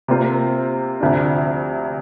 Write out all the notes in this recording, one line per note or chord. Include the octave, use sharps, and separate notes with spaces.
C3 A#3 F4 C5
D2 C3 F3 D4